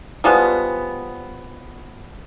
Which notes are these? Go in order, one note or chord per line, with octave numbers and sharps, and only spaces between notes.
F3 G3 G#3 B3